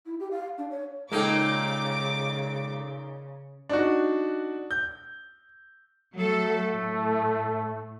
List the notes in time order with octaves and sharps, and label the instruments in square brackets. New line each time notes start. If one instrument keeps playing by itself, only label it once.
[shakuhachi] E4
G4
F5
D4
C#5
[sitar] A#2 A#3 D#4 [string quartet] C#3 [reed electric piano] G#3 A4 G5 [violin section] D6
[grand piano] D4 D#4 F#4
G6
[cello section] F#3 A4 [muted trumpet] A3
[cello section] A2